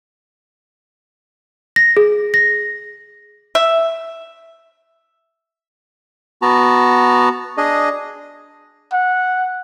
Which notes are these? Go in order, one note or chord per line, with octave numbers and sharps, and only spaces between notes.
A#6
G#4
A#6
E5
B3 F#4 A5 A#5
D4 G#4 D#5
F#5